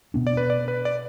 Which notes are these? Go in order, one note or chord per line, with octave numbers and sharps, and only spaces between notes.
B2 B3 D4
D5
B4
D5
B4
D5